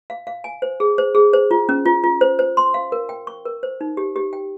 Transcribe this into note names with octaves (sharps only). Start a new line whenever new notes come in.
F5
F5
G#5
C5
G#4
C5
G#4
C5
F4
C#4
F4
F4
C5
C5
C6
F5
A#4
G5
C#6
A#4
C5
D#4
G4
G4
G5